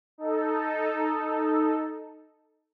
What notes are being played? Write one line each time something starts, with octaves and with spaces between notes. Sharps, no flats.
D#4 A4